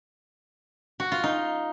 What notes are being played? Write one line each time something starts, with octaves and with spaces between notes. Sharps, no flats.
F#4
F4
D#4